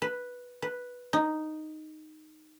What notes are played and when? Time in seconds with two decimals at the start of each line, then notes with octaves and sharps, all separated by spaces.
0.02 B4
0.62 B4
1.13 D#4